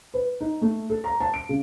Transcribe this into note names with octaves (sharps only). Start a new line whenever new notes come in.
B4
D#4
A3
A4
A#5
A5
D7
C#3